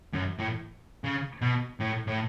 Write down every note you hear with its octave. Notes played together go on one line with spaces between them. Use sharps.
F#2
A2
C#3
B2
A2
A2